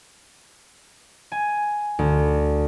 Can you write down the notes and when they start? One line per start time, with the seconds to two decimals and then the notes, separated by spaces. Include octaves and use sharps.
1.32 G#5
1.99 D2